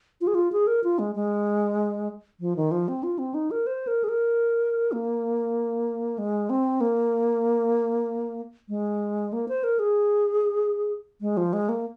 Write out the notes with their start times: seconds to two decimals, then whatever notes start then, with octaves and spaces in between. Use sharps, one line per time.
0.21 F4
0.27 G#4
0.35 F4
0.52 G#4
0.67 A#4
0.84 F4
0.99 G#3
1.15 G#3
2.40 F3
2.56 D#3
2.71 F3
2.88 C4
3.03 F4
3.19 C4
3.34 D#4
3.51 A#4
3.67 C5
3.87 A#4
4.04 G#4
4.09 A#4
4.92 A#3
6.18 G#3
6.50 C4
6.81 A#3
8.69 G#3
9.33 A#3
9.48 C5
9.64 A#4
9.79 G#4
11.21 G#3
11.37 F3
11.53 G#3
11.69 A#3